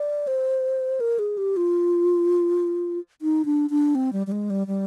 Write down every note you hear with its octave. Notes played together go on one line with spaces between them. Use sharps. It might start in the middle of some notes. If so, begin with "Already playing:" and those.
Already playing: D5
C5
A#4
G#4
G4
F4
D#4
D4
D4
C4
G3
G3
G#3
G3
G3